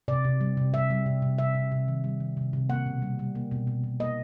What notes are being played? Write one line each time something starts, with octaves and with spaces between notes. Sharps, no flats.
C3 D5
C3
G3
C3
C3 E5
G3
C3
C3
C3 E5
C3
C3
D#3
G3
D#3
C3
C3
A#3 F#5
B2
G3
G3
A#3
B2
B2
B2
A#3 D#5